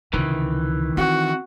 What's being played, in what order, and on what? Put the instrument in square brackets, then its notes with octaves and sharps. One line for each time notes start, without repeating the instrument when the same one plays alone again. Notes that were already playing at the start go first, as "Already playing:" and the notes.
[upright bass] C#2 C3 [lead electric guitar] D#3 E3
[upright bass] C4 [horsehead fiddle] F#4